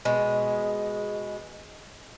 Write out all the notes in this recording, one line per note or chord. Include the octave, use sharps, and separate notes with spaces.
B2 G#3